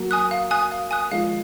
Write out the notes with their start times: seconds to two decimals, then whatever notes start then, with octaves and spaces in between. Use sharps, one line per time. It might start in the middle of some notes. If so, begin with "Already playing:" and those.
Already playing: F#3 A#3
0.11 G#5 D#6 F#6
0.31 F5
0.51 G#5 D#6 F#6
0.72 F5
0.91 G#5 D#6 F#6
1.11 F3 G#3 F5